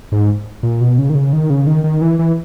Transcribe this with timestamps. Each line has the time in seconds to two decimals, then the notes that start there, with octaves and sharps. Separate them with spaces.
0.12 G#2
0.63 A#2
0.81 B2
0.98 C#3
1.10 D#3
1.15 C#3
1.33 D#3
1.50 C#3
1.67 D#3
1.84 D#3
2.01 E3
2.19 E3